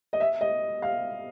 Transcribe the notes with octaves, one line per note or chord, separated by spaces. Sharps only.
D#5
E5
D#5
F5